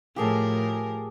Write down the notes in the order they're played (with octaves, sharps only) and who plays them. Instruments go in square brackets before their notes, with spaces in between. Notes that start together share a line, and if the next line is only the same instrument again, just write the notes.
[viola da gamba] A2 F3 A#4 [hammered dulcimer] G4 G#4 A5